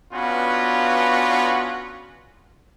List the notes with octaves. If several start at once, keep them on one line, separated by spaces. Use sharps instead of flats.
B3 C#4 D4 F4 F#4 B4